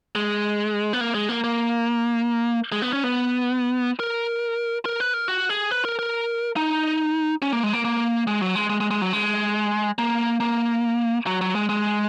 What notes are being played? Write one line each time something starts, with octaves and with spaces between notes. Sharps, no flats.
G#3
B3
A#3
G#3
A#3
A#3
G#3
B3
C#4
B3
A#4
A#4
B4
A#4
F#4
G#4
B4
A#4
A#4
D#4
C#4
A#3
G#3
A#3
A#3
G#3
F#3
G#3
G#3
G#3
G#3
F#3
G#3
A#3
A#3
F#3
F#3
G#3
G#3